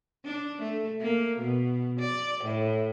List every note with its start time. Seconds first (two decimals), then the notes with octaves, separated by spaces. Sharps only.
0.25 D4
0.63 A3
1.01 A#3
1.39 B2
2.00 D5
2.45 A2